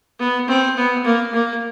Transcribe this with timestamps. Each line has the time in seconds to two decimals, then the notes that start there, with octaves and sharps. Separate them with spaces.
0.19 B3
0.48 C4
0.77 B3
1.05 A#3
1.33 A#3